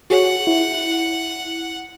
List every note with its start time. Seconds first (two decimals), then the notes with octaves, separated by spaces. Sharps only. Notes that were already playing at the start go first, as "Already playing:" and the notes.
0.10 F#4 G#4 C#5 F#5
0.47 E4